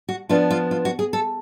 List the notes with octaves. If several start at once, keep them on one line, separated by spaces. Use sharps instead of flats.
F#4
F3 B3 D4 F4
F4
F4
F#4
G#4
A4